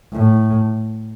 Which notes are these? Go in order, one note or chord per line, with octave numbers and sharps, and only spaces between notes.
A2